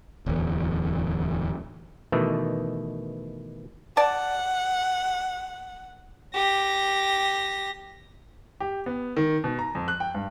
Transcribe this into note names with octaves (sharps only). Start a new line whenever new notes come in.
D1 E2
B2 D#3 E3 A3
D5 F#5 A5
G4 A#6
G4
B3
D#3
B2
A#5
F2
F#6
G5
G2